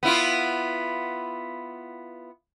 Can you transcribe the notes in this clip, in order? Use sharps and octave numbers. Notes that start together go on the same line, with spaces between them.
B3 E4 F4